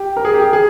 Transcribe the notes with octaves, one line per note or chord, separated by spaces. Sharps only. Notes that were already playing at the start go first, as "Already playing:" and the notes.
Already playing: G4
A#4
G#4
G4
G#4
G#4